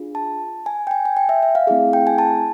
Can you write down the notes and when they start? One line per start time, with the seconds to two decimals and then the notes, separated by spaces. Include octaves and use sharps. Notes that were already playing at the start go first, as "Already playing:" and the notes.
Already playing: D4 F4 G#4
0.15 A5
0.66 G#5
0.87 G5
0.91 G#5
1.05 G#5
1.17 G5
1.29 E5
1.43 E5
1.55 F5
1.67 A3 C4 E4 G#4 F5
1.93 G5
2.07 G#5
2.18 A5